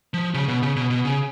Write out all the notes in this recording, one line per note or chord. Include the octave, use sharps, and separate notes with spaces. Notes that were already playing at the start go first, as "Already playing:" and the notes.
F3
C#3
B2
C#3
B2
B2
C#3